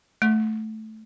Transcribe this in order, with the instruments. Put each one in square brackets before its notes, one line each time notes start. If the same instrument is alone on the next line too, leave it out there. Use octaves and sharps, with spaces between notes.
[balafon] A3